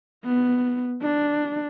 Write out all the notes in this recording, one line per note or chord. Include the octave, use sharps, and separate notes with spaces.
B3
D4